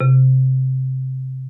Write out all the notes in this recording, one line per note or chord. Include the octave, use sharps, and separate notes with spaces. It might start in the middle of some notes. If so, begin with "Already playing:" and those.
C3